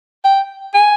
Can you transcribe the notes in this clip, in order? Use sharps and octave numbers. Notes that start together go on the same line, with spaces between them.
G5
G#5